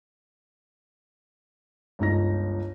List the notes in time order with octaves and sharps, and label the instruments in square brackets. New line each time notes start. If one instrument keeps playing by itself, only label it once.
[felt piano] G1 C#2 D#4 A#6